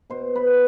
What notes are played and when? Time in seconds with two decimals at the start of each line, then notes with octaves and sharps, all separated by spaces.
0.10 B2 C5
0.36 B4